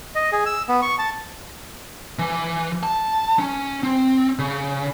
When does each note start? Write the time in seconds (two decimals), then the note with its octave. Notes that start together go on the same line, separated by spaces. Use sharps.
0.15 D#5
0.32 G#4
0.46 E6
0.69 B3
0.82 C#6
0.99 A5
2.19 E3
2.83 A5
3.39 C#4
3.83 C4
4.39 C#3